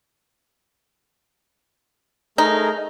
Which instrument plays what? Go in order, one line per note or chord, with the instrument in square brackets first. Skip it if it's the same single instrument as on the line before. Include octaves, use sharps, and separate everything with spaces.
[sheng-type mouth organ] A3 G#4 A#4 [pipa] D#4